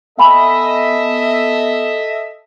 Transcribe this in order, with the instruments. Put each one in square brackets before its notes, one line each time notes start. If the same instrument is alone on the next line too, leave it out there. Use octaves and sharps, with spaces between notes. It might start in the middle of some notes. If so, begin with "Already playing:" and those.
[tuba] B3 [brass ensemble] A4 D#5 E5 [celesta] F#5 G#5 B5